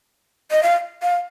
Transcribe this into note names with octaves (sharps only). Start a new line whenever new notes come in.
D#5
F5
F5